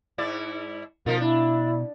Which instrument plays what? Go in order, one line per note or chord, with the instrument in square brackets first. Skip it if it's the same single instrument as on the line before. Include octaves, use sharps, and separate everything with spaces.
[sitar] G#2 E4 D5
[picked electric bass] B2 [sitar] F3 D#4 F4 [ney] A#4
[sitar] D4 [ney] E4